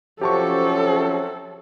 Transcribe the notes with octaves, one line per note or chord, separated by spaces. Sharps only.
C3 F3 F#3 C#4 G4 A4 A5 C#6